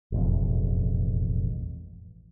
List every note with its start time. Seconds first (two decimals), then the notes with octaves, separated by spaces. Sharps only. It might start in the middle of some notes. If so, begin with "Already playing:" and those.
0.12 E1 A1 F2